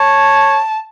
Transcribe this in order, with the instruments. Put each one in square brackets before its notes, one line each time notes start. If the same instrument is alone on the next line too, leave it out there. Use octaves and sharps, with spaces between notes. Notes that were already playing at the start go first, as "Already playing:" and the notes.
Already playing: [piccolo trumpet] C#5 [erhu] A5